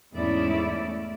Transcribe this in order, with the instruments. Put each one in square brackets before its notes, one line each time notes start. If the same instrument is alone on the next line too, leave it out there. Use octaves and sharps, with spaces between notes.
[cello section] E2 G#2 A3 C#4 E4 D5